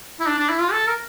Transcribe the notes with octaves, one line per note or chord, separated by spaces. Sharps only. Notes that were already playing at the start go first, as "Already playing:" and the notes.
E4
D4
D4
E4
F4
A4
A#4